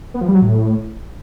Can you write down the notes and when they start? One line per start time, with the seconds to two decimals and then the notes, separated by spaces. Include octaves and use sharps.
0.14 B3
0.21 F3
0.28 G3
0.35 F#3
0.42 A2